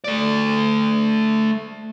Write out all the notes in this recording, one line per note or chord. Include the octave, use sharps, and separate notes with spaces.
A3 D5